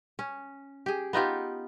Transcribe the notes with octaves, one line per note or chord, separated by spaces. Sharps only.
C#4
G4 G#4
B3 D#4 F4 G4